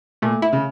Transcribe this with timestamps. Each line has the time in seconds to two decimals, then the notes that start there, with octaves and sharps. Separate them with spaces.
0.22 A#2 A3
0.42 E4
0.53 C#3